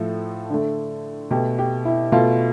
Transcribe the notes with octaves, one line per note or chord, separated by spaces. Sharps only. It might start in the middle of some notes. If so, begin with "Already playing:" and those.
Already playing: A2 F3 A3 A4
D3 A3
B2 A3 G4
G4
E4
B2 A3 F4